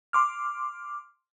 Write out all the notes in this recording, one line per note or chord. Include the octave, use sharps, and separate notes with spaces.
C6 D6 F6